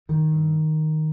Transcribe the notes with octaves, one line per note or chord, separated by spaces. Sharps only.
G2 D#3
G2